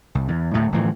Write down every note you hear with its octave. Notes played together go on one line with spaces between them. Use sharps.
C2
E2
D1 A2 A3
G1 A2 E3 F3